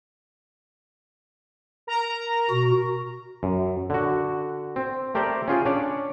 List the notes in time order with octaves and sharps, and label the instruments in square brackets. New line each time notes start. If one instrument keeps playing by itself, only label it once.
[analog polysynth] A#4 A#5
[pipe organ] B2 F#4
[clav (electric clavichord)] F#2
D3 F#4
C4
A3 G4 A#4 C5 D5
C#4 F4 G#4 G5
C#4 D4 C#5 D5